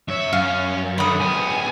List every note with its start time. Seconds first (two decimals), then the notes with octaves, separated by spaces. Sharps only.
0.08 F#2 C#5 E5
0.33 F#2 C#4 F5
0.98 D3 D#3 B5 D#6
1.20 C#2 B3 G#5